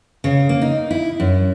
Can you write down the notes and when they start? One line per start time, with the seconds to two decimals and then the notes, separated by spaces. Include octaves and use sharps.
0.24 C#3
0.49 A#3
0.61 D#4
0.91 E4
1.20 F#2